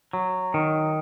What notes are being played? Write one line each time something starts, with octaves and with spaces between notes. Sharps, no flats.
F#3
D#3